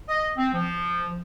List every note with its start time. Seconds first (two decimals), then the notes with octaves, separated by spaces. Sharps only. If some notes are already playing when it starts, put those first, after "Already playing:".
0.08 D#5
0.37 C4
0.53 F3